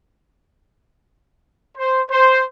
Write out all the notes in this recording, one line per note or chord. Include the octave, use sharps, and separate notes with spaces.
C5
C5